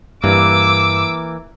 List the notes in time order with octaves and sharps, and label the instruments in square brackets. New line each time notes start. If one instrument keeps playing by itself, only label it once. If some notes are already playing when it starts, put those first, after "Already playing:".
[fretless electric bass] G2 [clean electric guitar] E3 A#3 [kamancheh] D6 E6